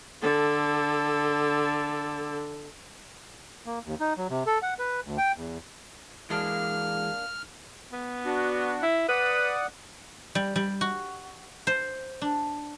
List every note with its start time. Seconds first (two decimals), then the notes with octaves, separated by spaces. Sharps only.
0.22 D3 A4
3.66 A#3
3.85 D#2
4.00 D#4
4.17 F#3
4.30 C3
4.47 A4
4.62 F#5
4.79 B4
5.05 D2
5.18 G5
5.36 E2
6.30 E3 G#3 A#3 D4 F6
7.93 B3
8.25 D4 F#4
8.82 E4
9.09 B4 D5 F#5 D#6
10.35 G3
10.56 G3
10.81 F#4
11.67 C5
12.21 D4